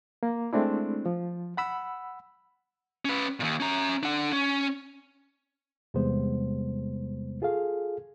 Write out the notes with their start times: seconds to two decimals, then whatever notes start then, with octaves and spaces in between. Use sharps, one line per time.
0.23 A#3
0.53 G#3 A3 C4 D4 E4
1.06 F3
1.57 F#5 B5 E6
3.05 C#4 B4
3.40 D#2 A#2
3.60 C#4 A#5
4.03 D4 F#5
4.33 C#4
5.94 E2 C3 G3 G#3 B3 C5
7.42 F4 G#4 A4 F5